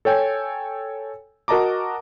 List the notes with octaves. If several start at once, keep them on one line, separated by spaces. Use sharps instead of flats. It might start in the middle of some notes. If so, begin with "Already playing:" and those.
A4 C#5 G5 G#5
F#4 A#4 D#5 A5 A#5 D6